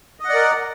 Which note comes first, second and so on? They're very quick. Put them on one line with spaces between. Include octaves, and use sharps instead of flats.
D#5 F#5 D5 A#4